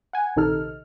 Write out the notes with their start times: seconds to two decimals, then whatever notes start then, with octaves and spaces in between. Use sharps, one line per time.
0.13 F#5 G#5
0.36 A#1 C3 D#3 D#4 A4 F6